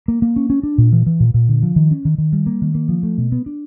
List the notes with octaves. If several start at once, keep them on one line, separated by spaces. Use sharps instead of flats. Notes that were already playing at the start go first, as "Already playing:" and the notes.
A#3
A#3
C#4
C#4
D4
A#2
E3
E3
A#2
A#2
D3
F3
D#3
C#4
D#3
D#3
G3
A#3
D#3
A#3
F3
A3
B2
B3
D4